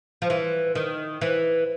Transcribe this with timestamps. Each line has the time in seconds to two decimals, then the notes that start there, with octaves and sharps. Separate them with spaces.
0.22 F3
0.30 E3
0.75 D#3
1.21 E3